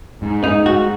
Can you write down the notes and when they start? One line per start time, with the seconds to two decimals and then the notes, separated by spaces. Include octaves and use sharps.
0.22 G#2
0.44 G#2 D#4
0.66 G#2 F#4